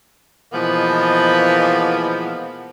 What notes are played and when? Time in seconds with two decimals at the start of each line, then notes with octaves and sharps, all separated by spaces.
0.52 B2 E3 F3 G#3 A#3 B3